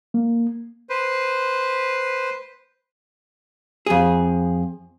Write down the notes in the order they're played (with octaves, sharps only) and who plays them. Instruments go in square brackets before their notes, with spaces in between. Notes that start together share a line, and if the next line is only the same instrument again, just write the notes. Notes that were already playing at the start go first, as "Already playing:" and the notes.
[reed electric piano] A#3
[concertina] B4 C5
[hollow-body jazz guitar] F2 G#4